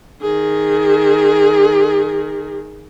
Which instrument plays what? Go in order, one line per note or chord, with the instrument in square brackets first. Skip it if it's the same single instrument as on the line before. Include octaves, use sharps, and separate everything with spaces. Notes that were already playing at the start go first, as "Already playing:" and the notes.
[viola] D#3 G#4